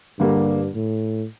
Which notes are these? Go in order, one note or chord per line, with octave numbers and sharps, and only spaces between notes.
G2 D3 G3 A#3
A2